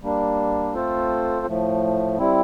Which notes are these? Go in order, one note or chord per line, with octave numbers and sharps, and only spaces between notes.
G3 A#3 D4
A3 C4 F4 A4 C5
A2 F3 A3
G3 C4 E4